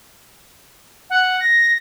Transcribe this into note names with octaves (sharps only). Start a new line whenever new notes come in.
F#5
A#6